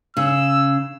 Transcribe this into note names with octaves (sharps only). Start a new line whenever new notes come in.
C#3 E6